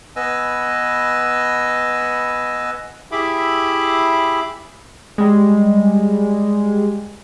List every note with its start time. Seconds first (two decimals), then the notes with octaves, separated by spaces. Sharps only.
0.16 B3 B4 D#5 G#5 E6
3.12 E4 G4 G#4 E5 B5 D6
5.18 G3 G#3